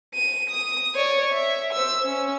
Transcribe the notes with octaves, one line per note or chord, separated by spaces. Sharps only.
D#7
D#6
C#5 D5
E5
C5 E6
C#4